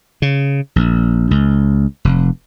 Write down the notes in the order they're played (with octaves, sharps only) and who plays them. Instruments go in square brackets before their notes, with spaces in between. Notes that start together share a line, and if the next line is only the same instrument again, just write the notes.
[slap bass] C#3
A#1
C#2
F1